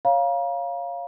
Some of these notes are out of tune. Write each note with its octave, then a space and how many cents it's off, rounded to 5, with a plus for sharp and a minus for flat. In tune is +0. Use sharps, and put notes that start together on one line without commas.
C#5 +0 F5 +0 A#5 +40